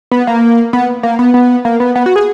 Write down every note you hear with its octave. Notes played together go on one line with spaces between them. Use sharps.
B3
A#3
B3
A#3
B3
B3
A#3
B3
B3
F#4
G#4